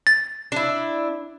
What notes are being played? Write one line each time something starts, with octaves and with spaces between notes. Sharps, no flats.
A6
D4 E4